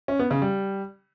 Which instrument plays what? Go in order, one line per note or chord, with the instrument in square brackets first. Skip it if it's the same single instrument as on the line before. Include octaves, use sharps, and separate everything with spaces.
[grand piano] C#4
B3
C#3
G3